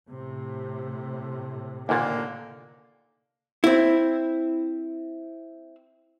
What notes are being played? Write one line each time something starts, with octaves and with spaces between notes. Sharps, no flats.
A2 C3
D#2 A#2 D3 A#3
C4 E4